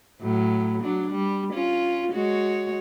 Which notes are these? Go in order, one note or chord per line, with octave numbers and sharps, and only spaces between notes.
A2 F#3
F#3 D4
G3
C#4 F4
G#3 F#4 C#5